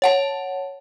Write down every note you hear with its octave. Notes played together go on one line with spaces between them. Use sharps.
C#5 F#5 A5